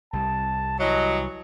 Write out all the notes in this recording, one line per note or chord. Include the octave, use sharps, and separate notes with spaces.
C2 G3 A5
E3 F#3 D#5